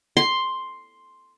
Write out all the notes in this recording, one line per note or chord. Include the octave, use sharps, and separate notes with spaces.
C6